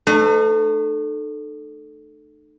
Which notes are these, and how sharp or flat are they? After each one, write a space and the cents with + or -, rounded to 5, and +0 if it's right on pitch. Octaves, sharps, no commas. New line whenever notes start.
A3 +0 D#4 -45 B4 +40